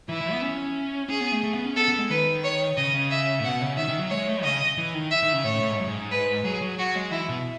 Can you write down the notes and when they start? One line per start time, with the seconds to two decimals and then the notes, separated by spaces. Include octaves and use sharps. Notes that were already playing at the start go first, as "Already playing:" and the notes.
0.09 E3 E4
0.21 E3
0.32 B3
0.42 C#4
1.09 C#4 G#4
1.21 B3
1.32 A3
1.43 A3
1.54 B3
1.66 C#4
1.76 B3 A4
1.88 B3
1.98 G#3
2.10 D#3 B4
2.44 C#5
2.77 C#3 D#5
2.94 C#3
3.11 E5
3.40 A2
3.44 B2 F#5
3.61 C#3
3.77 D#3 E5
3.89 D#3
3.99 F#3
4.10 G#3 C#5
4.28 A3
4.44 C#3 D#5
4.77 E3
4.94 D#3
5.11 E5
5.23 D#3
5.33 C#3
5.44 A2 C#5
5.61 A2
5.70 G#2
5.79 F#2
5.88 G#2
6.11 B4
6.44 F#3 G#4
6.62 F#3
6.78 F#3 F#4
6.95 G#3
7.11 E3 E4
7.29 B2